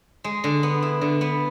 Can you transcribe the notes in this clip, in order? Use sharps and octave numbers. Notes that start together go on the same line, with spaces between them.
G#3
D3
B3
E4
D3
B3